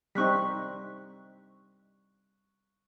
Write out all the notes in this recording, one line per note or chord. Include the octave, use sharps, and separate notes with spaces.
G3 C4 D#4 C#6 F#6 B6